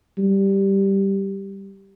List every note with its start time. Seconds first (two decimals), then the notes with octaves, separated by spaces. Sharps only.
0.18 G3